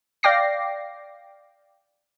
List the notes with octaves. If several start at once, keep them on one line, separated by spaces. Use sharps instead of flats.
D5 F5 G5 D6 A#6 C7